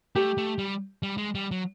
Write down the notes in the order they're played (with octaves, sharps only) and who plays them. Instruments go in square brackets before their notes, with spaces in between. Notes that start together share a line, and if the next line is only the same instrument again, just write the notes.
[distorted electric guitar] A3 [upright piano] G4
[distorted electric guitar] A3
G3
G3
G#3
G3
F#3